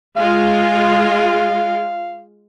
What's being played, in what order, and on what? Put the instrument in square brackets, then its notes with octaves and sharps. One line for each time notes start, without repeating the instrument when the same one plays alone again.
[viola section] G#3 F4 [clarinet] F5